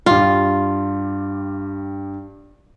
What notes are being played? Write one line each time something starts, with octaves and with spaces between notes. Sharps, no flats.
G2 F4 G4